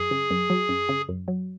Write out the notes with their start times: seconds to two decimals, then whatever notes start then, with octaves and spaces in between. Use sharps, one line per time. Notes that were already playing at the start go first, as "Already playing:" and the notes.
Already playing: F#2 G#4
0.11 C#3
0.31 F#2
0.50 F#3
0.69 F#2
0.89 C#3
1.09 F#2
1.28 F#3